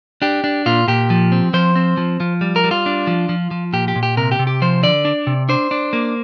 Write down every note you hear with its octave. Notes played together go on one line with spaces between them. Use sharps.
D4 G4
D4
A#2 F4
A#2 G4
F3
C4
F3 C5
C4
F3
F3
G3
A#4
G3
F4
D4
F3
F3
F3
A#2 G4
G4
A#2
G4
C3 A#4
G4
C3
G4
F3 C5
D3 D5
D4
C3
D4 C5
D4
A#3